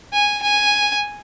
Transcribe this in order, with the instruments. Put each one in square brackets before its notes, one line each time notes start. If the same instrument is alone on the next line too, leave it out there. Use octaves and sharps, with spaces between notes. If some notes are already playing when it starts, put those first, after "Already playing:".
[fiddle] G#5
G#5